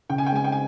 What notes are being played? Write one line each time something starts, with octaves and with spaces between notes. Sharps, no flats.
C#3 G5
G#5
G5
G#3 G#5
G5
G#5